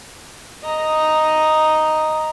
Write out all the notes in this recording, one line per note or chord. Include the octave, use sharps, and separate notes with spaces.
D#5 A#5